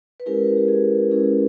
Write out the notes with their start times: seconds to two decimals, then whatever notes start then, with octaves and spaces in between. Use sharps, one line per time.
0.20 B4
0.26 G#3 C#4 E4 G4 A#4
0.57 G4
0.68 G#4
1.11 G#3 C#4 E4 G#4